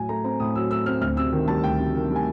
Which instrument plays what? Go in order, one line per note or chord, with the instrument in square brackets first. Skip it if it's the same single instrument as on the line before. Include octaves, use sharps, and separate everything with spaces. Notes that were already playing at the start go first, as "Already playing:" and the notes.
Already playing: [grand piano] A2 F#3 G#5
A3 A#5
C4 A#5
A2 D#6
F#3 E6
A3 E6
C4 F6
D2 F6
C3 E6
D#3
G3 A5
D2 G5
C3
D#3
G3
G#5